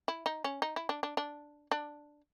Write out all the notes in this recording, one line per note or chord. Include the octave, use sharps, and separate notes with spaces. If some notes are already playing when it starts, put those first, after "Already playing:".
E4
D#4
C#4
D#4
E4
D4
D4
D4
D4